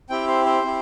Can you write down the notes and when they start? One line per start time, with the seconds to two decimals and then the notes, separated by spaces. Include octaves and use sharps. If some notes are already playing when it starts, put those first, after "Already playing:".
0.09 C4 E4 G4 G5
0.27 C5
0.46 C5
0.63 C4 E4 G4